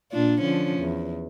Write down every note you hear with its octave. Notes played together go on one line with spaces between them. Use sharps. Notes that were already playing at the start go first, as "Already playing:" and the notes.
A#2 D4 F4
D3 F3 C#4
E2